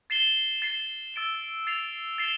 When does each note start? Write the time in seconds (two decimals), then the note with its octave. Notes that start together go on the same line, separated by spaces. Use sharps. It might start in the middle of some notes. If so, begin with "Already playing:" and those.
0.10 A6 C7 E7 G7
0.62 A6 C7 E7 G7
1.14 E6 A6 D7 G7
1.67 A6 C7 F7
2.18 A6 C7 E7 G7